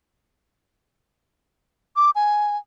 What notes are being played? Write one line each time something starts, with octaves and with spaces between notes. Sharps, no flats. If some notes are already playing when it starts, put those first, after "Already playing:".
D6
G#5